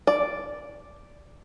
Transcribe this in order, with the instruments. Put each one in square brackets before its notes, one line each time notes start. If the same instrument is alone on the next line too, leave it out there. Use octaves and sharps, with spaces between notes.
[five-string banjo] D5